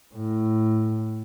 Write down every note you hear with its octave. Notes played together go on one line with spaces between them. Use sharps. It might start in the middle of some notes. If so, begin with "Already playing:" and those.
A2